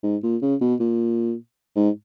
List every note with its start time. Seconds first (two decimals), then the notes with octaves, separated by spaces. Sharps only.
0.03 G#2
0.23 A#2
0.42 C#3
0.61 B2
0.80 A#2
1.76 G#2